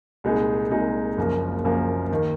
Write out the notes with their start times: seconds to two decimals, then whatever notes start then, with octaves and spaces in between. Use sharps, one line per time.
0.24 C2 A#2 G#3 D#4 G#4
0.71 C2 A#2 G#3 D#4 G#4
1.18 F#1 F#2 F3 A#3
1.64 F#1 F#2 F3 A#3
2.11 D#2 D#3 A#3